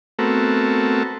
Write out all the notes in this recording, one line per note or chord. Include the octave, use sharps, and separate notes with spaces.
A3 B3 C4 F#4 A4 A#4